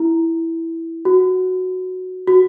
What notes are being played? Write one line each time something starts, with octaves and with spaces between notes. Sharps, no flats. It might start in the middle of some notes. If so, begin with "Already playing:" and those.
Already playing: E4
F#4
F#4